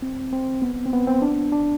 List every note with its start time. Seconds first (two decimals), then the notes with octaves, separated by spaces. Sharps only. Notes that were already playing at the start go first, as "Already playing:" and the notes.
0.02 C4
0.33 C4
0.62 B3
0.86 C4
0.93 B3
1.07 C4
1.22 D4
1.52 D4